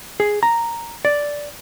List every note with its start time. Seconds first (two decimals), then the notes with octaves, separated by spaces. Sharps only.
0.20 G#4
0.43 A#5
1.05 D5